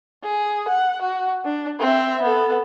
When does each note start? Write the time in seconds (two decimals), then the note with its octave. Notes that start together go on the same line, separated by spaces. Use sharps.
0.24 G#4
0.68 F#5
1.02 F#4
1.45 D4
1.80 C4 E5
2.22 B3 A4